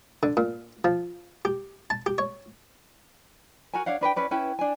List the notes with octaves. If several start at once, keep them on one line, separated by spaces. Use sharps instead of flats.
D3
A#2
F3
G4
A5
G4
C#5
F#4 A#4 G#5
D4 C#5 F5 F#5
D4 B4 C5 G5
C#4 B4 D5
C#4 E4 B4 G5
D4 G#5